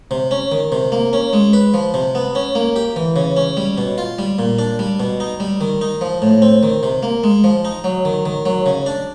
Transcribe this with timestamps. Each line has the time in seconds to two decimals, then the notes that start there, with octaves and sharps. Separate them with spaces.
0.11 C3
0.31 C#4
0.52 D#3
0.72 C3
0.92 A#3
1.13 C#4
1.33 G#3
1.53 B4
1.74 F3
1.94 C3
2.15 B3
2.35 C#4
2.55 A#3
2.76 G4
2.96 E3
3.16 C#3
3.36 C#4
3.57 G3
3.78 B2
3.98 F4
4.19 G3
4.39 A#2
4.59 D4
4.79 G3
5.00 B2
5.20 D#4
5.40 G3
5.61 D#3
5.81 D#4
6.01 F3
6.22 A2
6.42 C4
6.63 D#3
6.83 C3
7.03 A#3
7.24 G#3
7.44 F3
7.65 D#4
7.84 F#3
8.05 D#3
8.25 D#3
8.46 F#3
8.66 C#3
8.86 D4